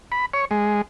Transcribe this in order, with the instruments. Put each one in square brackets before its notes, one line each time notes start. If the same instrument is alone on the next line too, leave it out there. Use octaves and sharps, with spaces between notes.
[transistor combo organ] B5
C#5
G#3